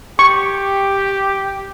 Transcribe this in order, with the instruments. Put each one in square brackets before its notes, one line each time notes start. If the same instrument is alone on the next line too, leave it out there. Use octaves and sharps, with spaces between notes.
[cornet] G4 [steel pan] C#6